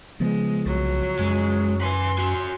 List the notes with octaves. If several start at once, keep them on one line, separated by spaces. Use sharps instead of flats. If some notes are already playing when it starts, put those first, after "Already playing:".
C#3 F3 G#3 B3
C2 F#3
F#2 G#3
B4 G#5 C6
F#4 G#5